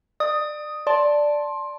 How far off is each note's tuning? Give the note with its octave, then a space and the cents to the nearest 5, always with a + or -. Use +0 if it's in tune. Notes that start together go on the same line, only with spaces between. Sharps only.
D5 +30 D#6 +5
D5 +0 A5 +0 C6 +15